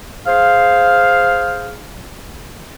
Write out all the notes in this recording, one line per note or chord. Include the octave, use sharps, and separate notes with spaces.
G#4 C5 F5